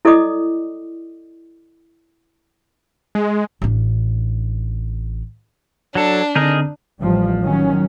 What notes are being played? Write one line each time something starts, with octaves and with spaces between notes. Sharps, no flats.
E4 A4 D5 D#5 D6 D#6
G#3
A1 D4
F#3 D4 A4
D3 C4 D#4 G#4 A#4
A1 F3 G3
D#3 F#3 C#4